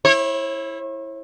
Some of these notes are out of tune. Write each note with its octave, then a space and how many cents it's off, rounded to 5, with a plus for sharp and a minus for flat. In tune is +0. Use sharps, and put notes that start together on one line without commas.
E4 +0 C#5 -40